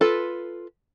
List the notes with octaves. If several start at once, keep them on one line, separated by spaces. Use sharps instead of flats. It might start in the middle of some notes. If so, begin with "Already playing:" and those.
F4 A4 B4